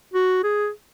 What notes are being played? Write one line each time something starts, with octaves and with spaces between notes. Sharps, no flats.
F#4
G#4